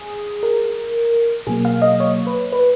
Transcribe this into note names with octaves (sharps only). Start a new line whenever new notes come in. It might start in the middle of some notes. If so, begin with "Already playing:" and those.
Already playing: G#4
A#4
B2 F#3 A#3 G#4
F5
D#5
C#5
B4
B4